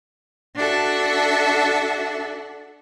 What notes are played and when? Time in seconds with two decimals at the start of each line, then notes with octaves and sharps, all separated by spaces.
0.56 D4 F#4 A4 E5